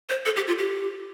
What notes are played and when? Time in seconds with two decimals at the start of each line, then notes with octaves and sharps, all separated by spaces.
0.09 C5
0.26 A4
0.36 G4
0.47 F4
0.58 G4